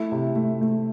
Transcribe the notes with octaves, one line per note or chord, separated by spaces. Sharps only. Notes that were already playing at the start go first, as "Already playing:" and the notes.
Already playing: A3 E4
C3
A3
A3